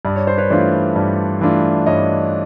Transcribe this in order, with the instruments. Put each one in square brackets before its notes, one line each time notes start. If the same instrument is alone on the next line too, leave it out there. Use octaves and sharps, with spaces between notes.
[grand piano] G2 D5
C#5
C5
B4 C#5
E3 A3 D4 F4 C5 D5
G2
E3 A3 D4 F4
G2 C#5 D#5